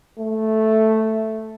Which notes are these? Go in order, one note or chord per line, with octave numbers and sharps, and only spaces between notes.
A3